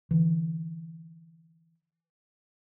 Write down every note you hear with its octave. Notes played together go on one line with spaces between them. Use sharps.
D3 E3